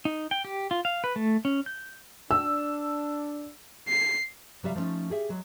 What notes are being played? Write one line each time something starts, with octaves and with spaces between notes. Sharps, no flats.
D#4
G5
G4
F4
F5
B4
A3
C#4
G6
D4 E6
C7
C3 F#3 G3 E5 F5
F3 A3 A#3 C#4 D#4
G4 G#4 E5
F#3 G#3